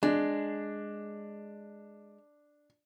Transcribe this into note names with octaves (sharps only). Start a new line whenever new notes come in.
G#3 D4